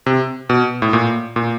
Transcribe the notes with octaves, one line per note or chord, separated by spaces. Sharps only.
C3
B2
A2
A#2
A#2